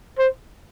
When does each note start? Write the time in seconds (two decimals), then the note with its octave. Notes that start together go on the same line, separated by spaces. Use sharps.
0.19 C5